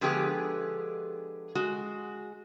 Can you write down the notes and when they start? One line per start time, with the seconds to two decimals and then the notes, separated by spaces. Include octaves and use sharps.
0.01 D3 F3 G#3 B3 G4 G#4
1.55 G#3 F#4